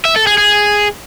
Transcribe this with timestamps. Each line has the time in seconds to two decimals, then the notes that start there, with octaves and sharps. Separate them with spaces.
0.05 E5
0.16 A4
0.27 G#4
0.38 G#4